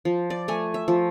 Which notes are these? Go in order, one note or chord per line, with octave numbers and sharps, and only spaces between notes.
F3
D5
A3 G#5
E5
F3